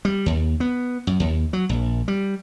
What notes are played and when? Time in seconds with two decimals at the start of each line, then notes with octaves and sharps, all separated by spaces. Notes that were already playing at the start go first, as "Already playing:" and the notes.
0.05 G3
0.26 D#2
0.60 B3
1.07 F#2
1.20 D#2
1.53 F#3
1.69 A#1
2.08 G3